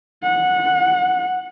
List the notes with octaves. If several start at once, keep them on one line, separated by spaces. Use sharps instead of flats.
F#5